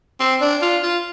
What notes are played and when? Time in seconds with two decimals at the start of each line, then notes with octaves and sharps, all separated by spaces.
0.20 C4
0.41 D4
0.62 F4
0.83 F4